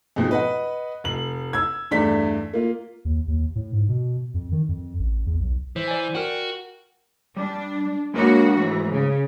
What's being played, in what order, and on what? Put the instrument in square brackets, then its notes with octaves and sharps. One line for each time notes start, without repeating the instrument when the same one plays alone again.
[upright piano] F2 G#2 B2 F3
B4 D#5 F#5
F1 F#7
E6 G#6
E2 G2 A3 D5 B6
A#3 F4
[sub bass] D#2
D#2
A2
G#2
B2
F2
D#3
F2
A1
E2
B1
[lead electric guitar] E3 [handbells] C5
[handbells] D5 G#5
[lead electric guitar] F#4 [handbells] A#4 G5
[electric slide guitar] G3 [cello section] D4
[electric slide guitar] G#3 D4 A#4 [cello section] A#3 F#4
[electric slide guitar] G#2 A3 [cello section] E3
[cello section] C#3